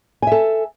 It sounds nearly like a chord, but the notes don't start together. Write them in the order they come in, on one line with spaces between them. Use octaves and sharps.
G#5 E5 A4